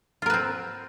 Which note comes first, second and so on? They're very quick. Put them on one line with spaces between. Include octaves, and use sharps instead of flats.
F4 A#4 B4 C4